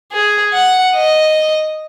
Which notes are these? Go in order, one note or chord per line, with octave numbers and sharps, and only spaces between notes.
G#4
F#5
D#5